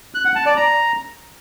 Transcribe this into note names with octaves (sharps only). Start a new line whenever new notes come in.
F#6
F#5
A5
D5
A#5